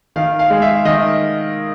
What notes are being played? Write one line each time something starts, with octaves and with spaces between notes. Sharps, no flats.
D#3 F5
F5
G#3
E5
D#3 D#5